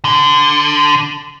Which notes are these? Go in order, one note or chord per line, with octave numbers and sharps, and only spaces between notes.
D3